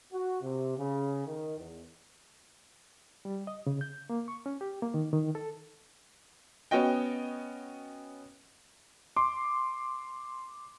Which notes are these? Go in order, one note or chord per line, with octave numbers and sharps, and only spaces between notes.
F#4
C3
C#3
D#3
E2
G3
D#5
C#3
G6
A#3
C#6
C#4
G4
A#3
D#3
D#3
A4
B3 C#4 F#4 D#5 G5
C6 D6